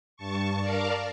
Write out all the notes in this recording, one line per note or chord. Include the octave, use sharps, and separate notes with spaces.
G2 A5 C#6
A#4 D5 F5 A5 A#5